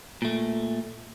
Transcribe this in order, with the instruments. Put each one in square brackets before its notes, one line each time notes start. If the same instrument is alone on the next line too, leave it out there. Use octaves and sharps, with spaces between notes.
[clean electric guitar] A#2 A3